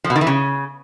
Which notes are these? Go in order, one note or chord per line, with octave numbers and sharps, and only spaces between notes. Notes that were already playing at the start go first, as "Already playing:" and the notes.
F3
B2
D#3
E3
C#3